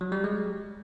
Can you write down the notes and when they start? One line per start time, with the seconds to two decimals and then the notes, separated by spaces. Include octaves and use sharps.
0.01 F#3
0.12 G3
0.24 G#3